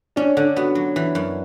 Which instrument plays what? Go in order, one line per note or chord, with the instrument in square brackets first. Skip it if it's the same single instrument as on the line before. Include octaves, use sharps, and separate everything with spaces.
[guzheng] C#4 [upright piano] D4
[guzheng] D3
[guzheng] B3 [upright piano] F#4
[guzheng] F#3
E3
F#2